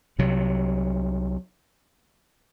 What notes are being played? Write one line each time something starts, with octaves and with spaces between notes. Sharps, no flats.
C2 C3 F#3